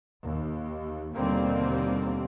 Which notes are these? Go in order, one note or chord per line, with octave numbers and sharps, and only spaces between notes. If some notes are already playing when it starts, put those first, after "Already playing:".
D#2
D#2 B2 D3 G3 A#3 C4